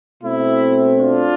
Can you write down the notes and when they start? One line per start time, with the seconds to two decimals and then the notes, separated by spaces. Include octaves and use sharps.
0.22 B2 A3 C4 E4
0.99 D4 F4